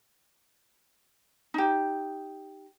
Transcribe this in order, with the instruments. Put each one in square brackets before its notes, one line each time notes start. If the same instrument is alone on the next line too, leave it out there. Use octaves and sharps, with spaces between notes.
[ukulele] D#4 G4